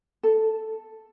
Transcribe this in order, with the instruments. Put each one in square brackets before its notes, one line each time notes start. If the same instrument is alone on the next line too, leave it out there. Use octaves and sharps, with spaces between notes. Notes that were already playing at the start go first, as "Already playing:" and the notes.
[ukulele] A4